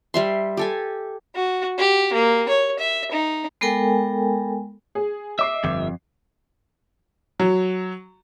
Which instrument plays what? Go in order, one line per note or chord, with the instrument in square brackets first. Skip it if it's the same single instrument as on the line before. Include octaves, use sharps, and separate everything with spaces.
[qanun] G3 E5 C6
G4 A4 G#5
[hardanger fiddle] F#4
G4
A#3
C#5
E5
D#4
[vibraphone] G#3 B3 A4 A#4 G5 G#5
[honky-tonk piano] G#4
[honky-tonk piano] D#5 D6 C7 [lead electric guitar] E5
[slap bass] G1 [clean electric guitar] F2
[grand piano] F#3